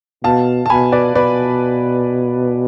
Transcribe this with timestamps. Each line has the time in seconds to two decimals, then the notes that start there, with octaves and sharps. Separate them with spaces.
0.24 B2 F5 A5
0.66 A5
0.70 B2 G#5 B5
0.92 B4 D5
1.15 B2 B4 D5